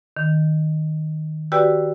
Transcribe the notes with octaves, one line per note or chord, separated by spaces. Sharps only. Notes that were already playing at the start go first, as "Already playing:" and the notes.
D#3
F#4 G4 B4 D5 G5 E6